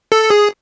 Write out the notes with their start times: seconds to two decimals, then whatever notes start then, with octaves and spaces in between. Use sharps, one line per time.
0.12 A4
0.30 G#4